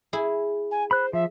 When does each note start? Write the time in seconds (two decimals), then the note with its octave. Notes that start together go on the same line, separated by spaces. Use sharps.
0.13 E4 G#4
0.71 G#5
0.91 C5 B5 F#6
1.13 F3 E5